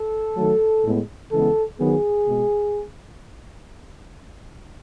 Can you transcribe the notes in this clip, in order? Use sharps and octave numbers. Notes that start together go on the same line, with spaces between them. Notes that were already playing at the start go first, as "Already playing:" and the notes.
Already playing: A4
D#3 F#3 A3
A2 G#3 B3
C#3 E3 G#3 B3 A4
D#3 F#3 B3 G#4
B2 G#3